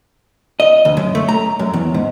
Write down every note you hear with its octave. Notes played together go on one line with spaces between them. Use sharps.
D#5
D2
F#2
A3
A#5
F#2
E2
G#2